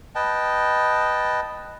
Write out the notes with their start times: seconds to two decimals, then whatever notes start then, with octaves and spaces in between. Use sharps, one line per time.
0.15 B4 D#5 G5 A5